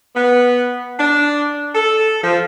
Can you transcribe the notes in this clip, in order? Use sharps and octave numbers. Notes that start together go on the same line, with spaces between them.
B3
D4
A4
F3